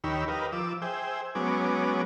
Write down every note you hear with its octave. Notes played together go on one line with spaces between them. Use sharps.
D#2 D#3 G4 C#5 B5 E6
G4 A#4 B4 D#5 F5
F3 D6 E6
G#4 C5 E5 G5
F#3 G#3 B3 C#4 D6